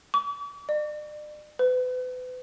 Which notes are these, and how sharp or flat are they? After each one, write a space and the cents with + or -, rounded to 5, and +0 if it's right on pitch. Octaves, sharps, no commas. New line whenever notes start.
D6 -45
D5 +40
B4 +35